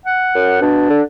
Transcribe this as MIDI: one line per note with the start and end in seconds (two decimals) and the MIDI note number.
0.06 0.61 78
0.35 0.57 42
0.61 0.88 47
0.61 1.02 62
0.90 1.02 50